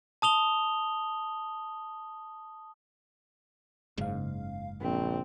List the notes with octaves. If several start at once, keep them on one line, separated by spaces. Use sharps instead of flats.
A5 D#6 F7 G7
F#1 G#2 C#3 F5
A#1 C#3 C4